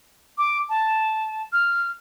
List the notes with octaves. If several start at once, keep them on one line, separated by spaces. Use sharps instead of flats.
D6
A5
F6